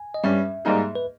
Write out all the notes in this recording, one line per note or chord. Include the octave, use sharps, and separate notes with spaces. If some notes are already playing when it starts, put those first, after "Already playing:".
Already playing: G#5
D#5
G2 G3 C#4 E5
G#2 G3 A#3 D#4 G#4
B4